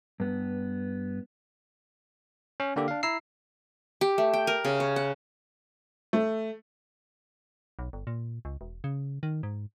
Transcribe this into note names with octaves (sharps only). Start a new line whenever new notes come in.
G2 B3
C#4
D3 A#3 D4 G4 A4
D4 F5
E4 A#5 E6 C7
G4
A3
G5
A#4
C#3
C#5
F#5
A3
B1
G1
A#2
C#2
E1
C#3
D#3
G#2